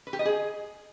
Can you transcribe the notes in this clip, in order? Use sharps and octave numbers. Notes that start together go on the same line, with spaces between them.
B4
G4
D#5
G#4